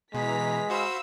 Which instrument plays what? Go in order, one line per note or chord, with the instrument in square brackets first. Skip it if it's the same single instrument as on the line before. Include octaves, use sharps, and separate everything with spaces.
[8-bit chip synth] B2 [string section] E3 A#5 B6 [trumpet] G#3
[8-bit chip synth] F#4 C5 C6 [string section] F5 B5 E6